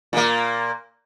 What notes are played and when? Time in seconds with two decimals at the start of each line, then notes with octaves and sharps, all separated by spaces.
0.13 A#2 A#3